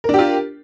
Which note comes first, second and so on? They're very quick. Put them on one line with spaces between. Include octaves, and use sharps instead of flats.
A#4 D4 G4 F4